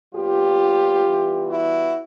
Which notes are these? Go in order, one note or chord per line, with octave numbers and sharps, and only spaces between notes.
A#2 F#3 B3 F4 G4
E3 G3 B3
E4 F#4